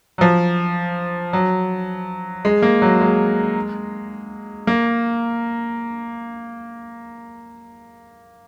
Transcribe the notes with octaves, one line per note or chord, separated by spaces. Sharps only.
F#3
F3
F#3
G#3
A#3
F#3
G#3
A#3